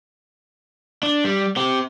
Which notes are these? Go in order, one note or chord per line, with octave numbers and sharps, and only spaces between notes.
D4
G3
C4 G4